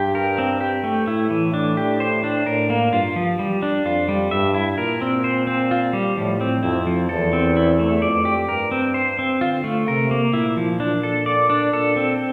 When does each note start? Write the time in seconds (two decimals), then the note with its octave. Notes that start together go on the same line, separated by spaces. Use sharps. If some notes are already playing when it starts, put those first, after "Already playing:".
Already playing: G2 G4
0.15 A#4
0.38 C4
0.61 G4
0.84 A3
1.07 A2 E4
1.30 E3
1.54 D4
1.77 G4
2.00 C5
2.24 D4
2.46 A2 A#4
2.70 A#3
2.92 G2 F4
3.16 F3
3.39 G3
3.62 D4
3.85 F2 F4
4.08 G3
4.31 G2 E5
4.54 E4
4.78 A#2 A#4
5.02 C4
5.24 C5
5.47 C4
5.71 F4
5.93 G3
6.17 A2 F3
6.41 C4
6.63 F2 E4
6.87 F3
7.09 E2 A4
7.33 C4
7.57 E4
7.79 A3
8.02 F2 D5
8.25 G4
8.49 G2 A#4
8.72 C4
8.94 C5
9.19 C4
9.41 D3 F4
9.64 A3
9.88 C3 A#4
10.11 A#3
10.33 A#2 E4
10.57 F3
10.80 D4
11.03 A4
11.26 D5
11.50 D4
11.73 A#2 A4
11.96 C4